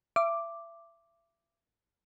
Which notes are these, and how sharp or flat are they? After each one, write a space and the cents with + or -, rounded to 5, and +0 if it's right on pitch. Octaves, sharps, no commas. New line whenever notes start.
E5 +30 D6 +0